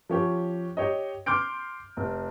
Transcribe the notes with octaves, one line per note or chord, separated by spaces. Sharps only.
F3 C#4 G4
G4 C#5 D#5
C6 D6 F6 G6 D7
F1